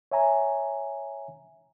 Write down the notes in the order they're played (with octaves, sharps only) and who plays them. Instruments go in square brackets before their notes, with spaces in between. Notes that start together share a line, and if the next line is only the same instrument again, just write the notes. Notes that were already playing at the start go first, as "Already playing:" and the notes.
[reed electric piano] C#5 E5 G#5 A#5